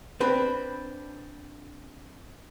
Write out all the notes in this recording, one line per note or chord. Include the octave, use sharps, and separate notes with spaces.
C4 D4 B4